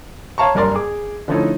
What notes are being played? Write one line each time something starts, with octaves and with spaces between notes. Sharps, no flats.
C#5 F5 A5 A#5 C#6
F#1 G2 A#4 D5 C6
G#4 D6
D3 F3 A3 C#4 D#4 E4